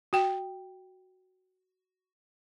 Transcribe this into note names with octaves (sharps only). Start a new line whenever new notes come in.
F#4 G5